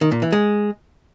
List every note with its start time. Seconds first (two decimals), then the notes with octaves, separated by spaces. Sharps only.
0.01 D#3
0.12 A#2
0.22 E3
0.32 G#3